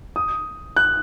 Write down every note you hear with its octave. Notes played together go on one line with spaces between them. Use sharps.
D#6
F#6